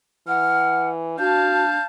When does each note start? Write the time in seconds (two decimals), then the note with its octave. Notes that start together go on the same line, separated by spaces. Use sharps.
0.27 E3 F#5 F6
1.19 D4 F#4 F5 A5 G6